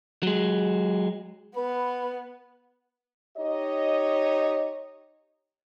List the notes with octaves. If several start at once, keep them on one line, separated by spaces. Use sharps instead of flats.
F#3 G#3
B3 B4
D#4 G4 C#5 D#5